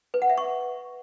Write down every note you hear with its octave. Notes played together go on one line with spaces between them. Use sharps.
B4
F#5
E5
C#6